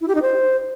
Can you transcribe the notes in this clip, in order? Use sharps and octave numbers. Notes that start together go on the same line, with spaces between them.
E4
G4
D#4
C5